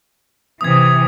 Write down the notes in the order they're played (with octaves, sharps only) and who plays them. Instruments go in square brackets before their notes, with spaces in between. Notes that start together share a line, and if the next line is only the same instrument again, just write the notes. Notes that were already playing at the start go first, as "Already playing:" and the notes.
[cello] C3 E3 [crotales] D#6 G#6